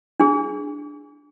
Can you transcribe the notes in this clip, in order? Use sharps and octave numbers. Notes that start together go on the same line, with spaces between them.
D4 G#4